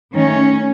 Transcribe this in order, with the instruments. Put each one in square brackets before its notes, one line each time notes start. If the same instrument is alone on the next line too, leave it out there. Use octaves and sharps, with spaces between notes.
[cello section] D#3 A3 C#4